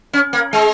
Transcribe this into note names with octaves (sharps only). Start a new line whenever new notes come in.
C#4
A#3
G#3